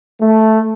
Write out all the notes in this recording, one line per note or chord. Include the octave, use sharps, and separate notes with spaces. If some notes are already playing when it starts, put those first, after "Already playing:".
A3